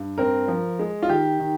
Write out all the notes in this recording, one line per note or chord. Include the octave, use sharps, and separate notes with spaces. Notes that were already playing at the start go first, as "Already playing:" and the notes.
Already playing: G2
C4 A#4
F3
G#3
F4
D#3 G4
D#3